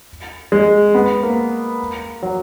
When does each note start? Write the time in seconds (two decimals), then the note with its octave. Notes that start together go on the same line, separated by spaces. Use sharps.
0.52 G#3
0.95 B3
1.23 A#3
2.23 F#3